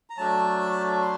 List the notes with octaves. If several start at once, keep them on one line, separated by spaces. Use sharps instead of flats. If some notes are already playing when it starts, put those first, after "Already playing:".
A#5
F#3 A3 D4 A5
C6